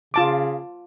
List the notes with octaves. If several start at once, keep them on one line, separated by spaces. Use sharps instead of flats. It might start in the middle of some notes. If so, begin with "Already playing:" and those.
C#3 F4 A5 D6